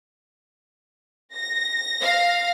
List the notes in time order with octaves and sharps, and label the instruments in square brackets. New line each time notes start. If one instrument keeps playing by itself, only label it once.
[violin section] A#6
[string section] F5